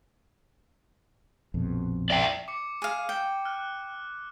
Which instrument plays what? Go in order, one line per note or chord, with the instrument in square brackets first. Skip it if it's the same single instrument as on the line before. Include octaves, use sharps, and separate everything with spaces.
[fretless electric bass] A#1 F2 B2
[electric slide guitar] D5 E5 G5
[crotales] D6 C#7
[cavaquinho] G#4 F5
G5
[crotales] F6 F#6